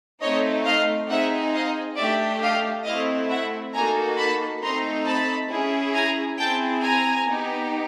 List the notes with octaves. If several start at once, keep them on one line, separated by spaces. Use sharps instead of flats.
A3 C4 D#4 C#5 D#5
D#5 F5
C4 D#4 G#4 E5 F#5
D#5 F5
A3 D4 G4 D5 E5
D#5 F5
A3 C4 E4 D#5 F5
E5 F#5
A#3 D#4 F#4 A4 G#5 A#5
A5 B5
A3 C4 D#4 A#5 C6
A5 B5
C#4 E4 G#4
G#5 A#5
C4 E4 G#4 G5 A5
G#5 A#5
B3 D#4 G4